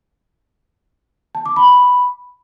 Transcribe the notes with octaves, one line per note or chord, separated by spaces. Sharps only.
A5
D6
B5